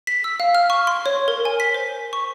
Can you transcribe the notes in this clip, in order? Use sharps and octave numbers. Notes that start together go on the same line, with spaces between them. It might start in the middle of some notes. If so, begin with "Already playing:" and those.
B6
E6
F5
F6
C#6
C6
C#5
A#4
G#5
B6
C5
C#6